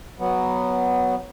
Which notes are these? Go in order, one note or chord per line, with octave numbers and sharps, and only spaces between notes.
F#3 B3